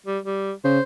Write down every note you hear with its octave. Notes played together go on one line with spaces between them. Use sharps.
G3
G3
C#3 C5